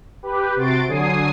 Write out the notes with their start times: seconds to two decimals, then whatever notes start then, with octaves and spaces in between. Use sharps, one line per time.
0.23 G4 B4
0.56 C3 F#4 C6 A6 D7
0.88 D3 F#3 G#5 D#6 C7